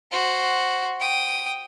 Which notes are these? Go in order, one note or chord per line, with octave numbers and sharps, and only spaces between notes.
F#4 C5
G5 D#6